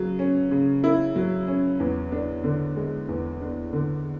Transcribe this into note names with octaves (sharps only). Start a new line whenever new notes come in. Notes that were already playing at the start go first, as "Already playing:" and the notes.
Already playing: C#3 F#3
C#4
C#3
E4
F#3
C#4
E2
D4
D3
G#3
E2
D4
D3